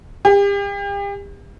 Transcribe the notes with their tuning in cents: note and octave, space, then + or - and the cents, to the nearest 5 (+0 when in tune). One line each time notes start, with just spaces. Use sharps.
G4 +40